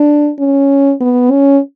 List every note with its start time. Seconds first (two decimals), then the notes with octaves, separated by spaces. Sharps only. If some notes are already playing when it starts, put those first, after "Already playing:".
Already playing: D4
0.39 C#4
1.01 B3
1.31 C#4